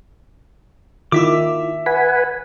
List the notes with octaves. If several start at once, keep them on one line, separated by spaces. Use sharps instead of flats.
D#3 E4 F4 E5 D6
B4 F#5 G#5 B6